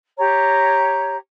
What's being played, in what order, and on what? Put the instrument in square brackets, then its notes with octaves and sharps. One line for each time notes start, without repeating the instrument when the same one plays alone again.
[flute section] G4 C#5 A#5